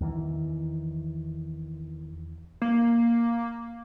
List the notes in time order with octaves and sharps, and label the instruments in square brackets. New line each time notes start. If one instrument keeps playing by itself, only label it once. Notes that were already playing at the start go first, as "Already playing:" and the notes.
[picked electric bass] E2 D#3 E3
[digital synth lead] A#3